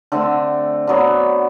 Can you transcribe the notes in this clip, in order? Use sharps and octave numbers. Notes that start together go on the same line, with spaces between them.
D3 A3 C4
D3 F#3 B3